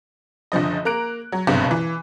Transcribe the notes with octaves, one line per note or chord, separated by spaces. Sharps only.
F#1 D3 F3 D#5
A#3 A#5 F#6 D7
F#3
F#1 C2 G2 B2 F#3
E3